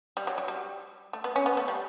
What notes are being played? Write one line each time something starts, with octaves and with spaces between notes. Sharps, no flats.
G3
F#3
F#3
G3
A3
B3
C#4
B3
A3
G3